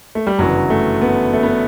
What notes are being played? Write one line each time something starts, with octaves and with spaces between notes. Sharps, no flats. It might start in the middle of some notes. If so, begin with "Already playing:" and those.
A3
G3
G1 F#2 C#3 E3 F#3
A3
B3
A3
B3